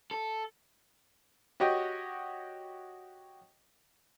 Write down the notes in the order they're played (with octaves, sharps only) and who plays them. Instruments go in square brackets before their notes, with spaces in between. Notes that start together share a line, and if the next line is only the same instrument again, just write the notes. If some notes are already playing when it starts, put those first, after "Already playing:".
[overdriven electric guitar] A4
[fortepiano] F#4 G4 C#5 D#5 G5